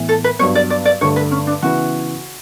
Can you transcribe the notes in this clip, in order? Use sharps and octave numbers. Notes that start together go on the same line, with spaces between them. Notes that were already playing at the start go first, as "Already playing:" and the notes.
Already playing: A2 E3 B3
A4
B4
G2 F#3 B3 C#5
D5
D5
D5
G2 D3 A3 C#5
B4
C#4
D4
C#3 E3 B3 E4 F#4 B4